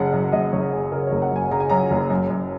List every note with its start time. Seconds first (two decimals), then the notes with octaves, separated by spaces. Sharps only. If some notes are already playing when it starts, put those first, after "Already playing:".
Already playing: F#1 C#3 F#5
0.13 F#2
0.32 F#1 D#5
0.52 F#1 C#5
0.73 C#3 G#4
0.92 C#3 A#4
1.07 C#5
1.12 F#1
1.22 F#5
1.31 F#2 G#5
1.51 C#3 A#5
1.60 G#5
1.70 F#2 A#5
1.91 F#1
2.10 F#2
2.30 F#2